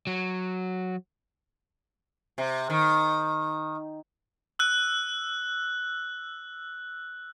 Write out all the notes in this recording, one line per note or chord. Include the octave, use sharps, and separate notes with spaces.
F#3
C3
D#3
E6 F#6